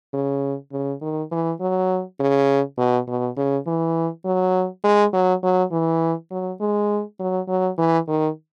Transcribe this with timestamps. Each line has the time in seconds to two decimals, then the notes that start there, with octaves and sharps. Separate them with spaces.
0.13 C#3
0.72 C#3
1.01 D#3
1.31 E3
1.60 F#3
2.20 C#3
2.78 B2
3.07 B2
3.37 C#3
3.67 E3
4.25 F#3
4.84 G#3
5.13 F#3
5.43 F#3
5.72 E3
6.31 F#3
6.60 G#3
7.19 F#3
7.48 F#3
7.78 E3
8.08 D#3